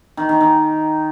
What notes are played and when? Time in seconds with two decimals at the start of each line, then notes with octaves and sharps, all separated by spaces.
0.17 D#3
0.29 D#3
0.41 D#3